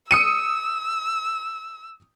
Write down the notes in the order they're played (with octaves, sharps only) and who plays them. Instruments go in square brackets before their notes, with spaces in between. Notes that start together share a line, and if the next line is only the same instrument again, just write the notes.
[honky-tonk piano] D#6 C#7 D#7 [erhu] E6